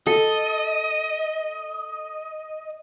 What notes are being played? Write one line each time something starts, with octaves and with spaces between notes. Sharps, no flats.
A4 D#5